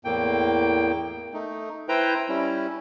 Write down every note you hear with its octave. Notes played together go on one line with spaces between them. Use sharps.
E2 A2 A#3 G5
A3 D#4
E4 B4 C5 G5 A#5 G6
G3 C#4 E4